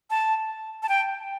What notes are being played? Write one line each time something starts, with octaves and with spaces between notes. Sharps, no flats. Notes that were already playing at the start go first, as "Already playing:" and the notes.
A5
A5
G5